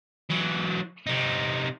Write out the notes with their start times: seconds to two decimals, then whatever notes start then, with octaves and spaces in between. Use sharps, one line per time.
0.30 E3 F#3
1.07 C3 D#4